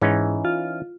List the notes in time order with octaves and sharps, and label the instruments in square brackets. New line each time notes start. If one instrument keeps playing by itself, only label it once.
[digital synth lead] G#2 [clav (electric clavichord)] E3 C#4 D#4
[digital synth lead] F4